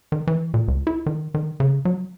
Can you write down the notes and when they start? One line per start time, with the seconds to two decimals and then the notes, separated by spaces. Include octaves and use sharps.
0.12 D#3
0.27 E3
0.54 A#2
0.68 C#2
0.87 E4
1.06 D#3
1.34 D#3
1.60 C#3
1.85 F#3